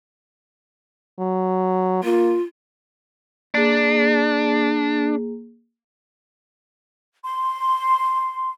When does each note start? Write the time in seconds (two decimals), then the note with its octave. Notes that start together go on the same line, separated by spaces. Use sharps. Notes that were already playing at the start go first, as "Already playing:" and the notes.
1.19 F#3
2.04 A#3 F4
3.55 A#3 D4 G#4
7.24 C6